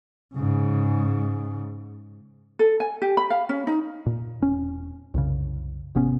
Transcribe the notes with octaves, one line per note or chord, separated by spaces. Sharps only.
G#2 C#3
A4
G#5
G4
B5
F5
C#4
D#4
A#2
E1 C#4
C2 F#2 C#3
G#1 C3 B3 C#4